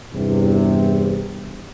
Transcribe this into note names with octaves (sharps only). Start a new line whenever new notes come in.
E2 G2 C3